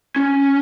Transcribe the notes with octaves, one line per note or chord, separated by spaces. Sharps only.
C#4